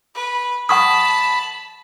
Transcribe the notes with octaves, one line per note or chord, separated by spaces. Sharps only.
B4
F#5 A5 B5 C#6 D#6